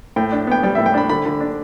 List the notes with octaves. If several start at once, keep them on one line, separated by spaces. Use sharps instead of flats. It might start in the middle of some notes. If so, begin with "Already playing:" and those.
A2 G5
D4
B3 G5
G3 G5
A2 E5
G5
D4 B5
D3 B5
D3
D4